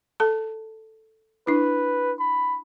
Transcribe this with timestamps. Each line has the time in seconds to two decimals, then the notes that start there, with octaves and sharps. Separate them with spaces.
0.20 A4 A5
1.47 D4 E4 B4
2.20 B5